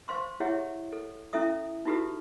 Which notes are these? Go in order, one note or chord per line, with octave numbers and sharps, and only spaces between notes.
C5 F5 C6 C#6
E4 G4 G#4 C#5 E5 F#5
A4
C#4 E4 A4 E5 D#6
D#4 E4 F#4 G4 A4 B4